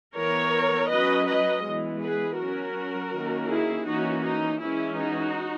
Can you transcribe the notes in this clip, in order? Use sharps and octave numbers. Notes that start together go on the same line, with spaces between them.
E3 B3 A#4 C#5
F#3 C#4 B4 D#5
B4 D#5
E3 G#3 B3
G#4 B4
F#3 C#4 F#4 A#4
D#3 A#3 C#4
E4 G#4
E3 A#3 C#4 D#4 F#4
D#4
E3 G#3 C#4 E4
D#4 F#4